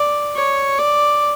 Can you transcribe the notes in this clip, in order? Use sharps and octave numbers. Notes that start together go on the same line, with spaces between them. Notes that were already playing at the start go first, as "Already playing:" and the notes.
Already playing: D5
C#5
D5